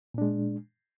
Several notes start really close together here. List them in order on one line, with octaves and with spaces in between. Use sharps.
A#2 D4 G#3